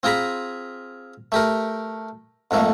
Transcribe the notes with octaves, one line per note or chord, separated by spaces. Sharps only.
C4 F4 G#4 A#5 B5
A3 G4 A#4
F2 G#2 A3 A#3